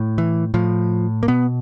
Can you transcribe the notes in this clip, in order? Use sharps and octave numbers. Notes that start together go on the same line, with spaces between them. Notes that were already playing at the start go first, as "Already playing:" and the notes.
Already playing: A2
E3
A2 F3
A#3
B2 B3